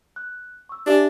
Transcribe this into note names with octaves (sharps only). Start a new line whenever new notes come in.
F#6
C#6 E6
D4 G4 E5 G#5